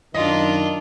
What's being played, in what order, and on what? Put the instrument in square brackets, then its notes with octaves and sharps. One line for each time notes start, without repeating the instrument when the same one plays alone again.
[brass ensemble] F#2 D#3 [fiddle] D4 F4 [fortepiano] D#5